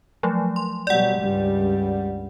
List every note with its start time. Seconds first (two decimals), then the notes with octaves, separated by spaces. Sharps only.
0.23 F3 F#3 A3
0.56 C6
0.87 B2 F#3 G3 D5 F#5
1.18 C#2 G2 G3